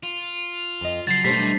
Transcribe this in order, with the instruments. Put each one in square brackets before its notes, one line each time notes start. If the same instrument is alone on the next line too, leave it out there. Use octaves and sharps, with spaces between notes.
[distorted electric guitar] F4
[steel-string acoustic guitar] F2 D#5
[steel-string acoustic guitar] C#3 F#3 [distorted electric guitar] F3 [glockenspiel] A6 C7
[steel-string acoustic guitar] B2 A3 C5 [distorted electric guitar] E3 D#4 [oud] G3 D4 [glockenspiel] B6